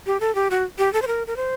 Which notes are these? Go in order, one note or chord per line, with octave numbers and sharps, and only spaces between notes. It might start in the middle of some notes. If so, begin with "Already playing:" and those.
G4
A4
G4
F#4
G4
A4
C5
A#4
A#4
C5